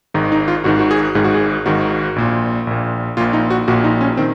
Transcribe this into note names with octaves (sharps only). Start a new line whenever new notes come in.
G#1 G#2 D#3 D#4
D#4
F4
G#1 G#2 D#3 F#4
F#4
G#4
G#1 G#2 D#3 G#4
F#4
G#4
G#1 G#2 D#3 F#4
A#1 A#2
A#1 A#2
A#1 A#2 F4
D#4
F#4
A#1 A#2 F#4
D#4
C#4
D#3 C4